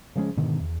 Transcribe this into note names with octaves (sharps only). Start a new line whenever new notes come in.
C#3 F3 G#3 C#4
G#2 B2 D3 D#3
E2